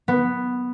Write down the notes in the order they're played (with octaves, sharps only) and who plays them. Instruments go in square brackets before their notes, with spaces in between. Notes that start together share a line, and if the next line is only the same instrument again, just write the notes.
[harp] B3